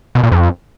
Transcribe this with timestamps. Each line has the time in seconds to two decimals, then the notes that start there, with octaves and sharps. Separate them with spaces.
0.15 B2
0.23 A#2
0.32 F2